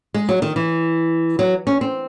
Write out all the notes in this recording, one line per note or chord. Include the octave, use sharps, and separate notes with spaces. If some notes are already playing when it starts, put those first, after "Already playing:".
G#3
F#3
D#3
E3
F#3
C#4
C4